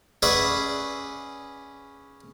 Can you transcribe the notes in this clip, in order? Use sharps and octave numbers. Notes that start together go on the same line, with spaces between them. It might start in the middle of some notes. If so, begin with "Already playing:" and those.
C#4 G#4 B4 D5 E5 F#5